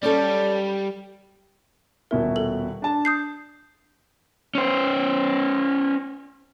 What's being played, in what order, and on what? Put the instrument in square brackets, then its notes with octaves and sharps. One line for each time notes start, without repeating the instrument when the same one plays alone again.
[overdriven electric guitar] G3 [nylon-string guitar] C#4 G4 A4 [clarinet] D5
[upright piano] D#1 B2 E4 [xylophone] A#4
[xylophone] A4 F#7
[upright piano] D4 A5
[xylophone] D#6 G6 C7
[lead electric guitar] C#4 C5